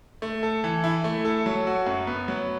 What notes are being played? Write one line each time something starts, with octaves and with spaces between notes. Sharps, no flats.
A3
A4
E3
E4
A3
A4
F#3
F#4
F#2
B3
F#3